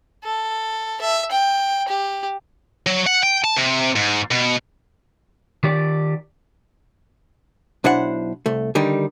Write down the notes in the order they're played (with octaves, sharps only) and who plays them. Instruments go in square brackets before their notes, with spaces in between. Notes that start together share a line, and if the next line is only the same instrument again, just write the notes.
[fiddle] A4
E5
G5
G4
[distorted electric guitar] F#3
F#5
G5
A5
C3
G#2
B2
[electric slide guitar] D#3 G4 D5
[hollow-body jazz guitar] B1 D4 E4 C5 F#5
C2 A3
D3 D#3 G3 D#4